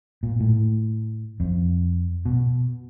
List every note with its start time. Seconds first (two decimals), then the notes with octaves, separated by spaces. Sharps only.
0.23 A#2
0.40 A2
1.40 F2
2.26 B2